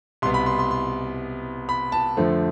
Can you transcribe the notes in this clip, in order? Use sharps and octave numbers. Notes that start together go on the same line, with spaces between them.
C2 B2 B3 C6
B5
C6
C6
C6
B5
A5
F2 D3 F3 A3 C4